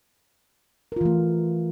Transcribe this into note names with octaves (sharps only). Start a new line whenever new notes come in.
E3 A3 F4 A#4